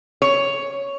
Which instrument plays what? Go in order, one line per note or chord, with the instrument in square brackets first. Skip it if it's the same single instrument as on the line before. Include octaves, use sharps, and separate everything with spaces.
[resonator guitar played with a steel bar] C#5